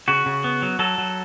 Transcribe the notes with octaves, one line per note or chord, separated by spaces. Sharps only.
C#3 F#4
C#3
B3
F#3
F#3 A4
F#3